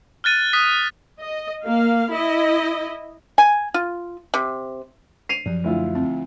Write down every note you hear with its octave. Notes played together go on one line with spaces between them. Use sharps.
F6 F#6 A6 D#7
D#6 F#6 B6
D#5
A#3 F5
E4 D#5
G#5
F4
C3
C7 D#7 F7
F#2 F3
D2 E4 F4
C4